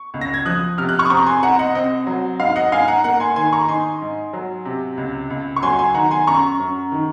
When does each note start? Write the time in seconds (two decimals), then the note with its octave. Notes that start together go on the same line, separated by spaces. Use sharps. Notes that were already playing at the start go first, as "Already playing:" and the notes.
Already playing: C#6
0.14 C#2
0.21 A#6
0.34 G#6
0.45 F3 D#6 F#6
0.78 C3 F6
0.89 F#6
0.99 C#6 F6
1.05 D#6
1.10 C4 A#5 C#6
1.26 G#5 C6
1.43 C2 F#5 A#5
1.59 D#5 F#5
1.75 C4 D#5
2.07 F#3
2.39 G#2 F5
2.56 D#5 F#5
2.72 G#2 F5 G#5
2.88 F#5 A#5
3.04 A#3 F#5 A#5
3.20 G#5 C6
3.36 D#3 G#5 C6
3.53 A#5 C#6
3.68 D#4 G#5 C6
4.01 G#2
4.33 F#3
4.65 C3
4.97 C#2
5.30 C#2
5.56 C#6
5.63 F#3 G#5 C6
5.79 G#5 C6
5.95 D#3 F#5 A#5
6.11 G#5 C6
6.27 F#2 A#5 C#6
6.59 F#2
6.92 D#3